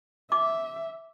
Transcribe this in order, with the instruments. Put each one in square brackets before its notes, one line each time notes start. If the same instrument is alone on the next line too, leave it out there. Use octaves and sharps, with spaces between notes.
[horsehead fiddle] E5 [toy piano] D6